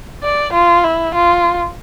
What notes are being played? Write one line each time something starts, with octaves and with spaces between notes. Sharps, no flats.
D5
F4
E4
F4